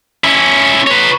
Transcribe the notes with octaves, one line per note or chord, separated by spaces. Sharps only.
C#4 E4
B4 C#5